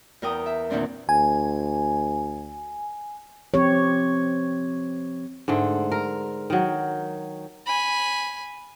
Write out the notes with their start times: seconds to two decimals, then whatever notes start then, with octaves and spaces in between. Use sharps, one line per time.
0.22 E2 A#4 G5 D#6
0.46 E5
0.70 E2 A#2 D#3 C4 D4
1.09 D2 G#5
3.54 F3 C4 G4 C#5
5.48 G#2 D3 A3
5.92 A#4
6.50 D#3 F#3
7.66 G#5 B5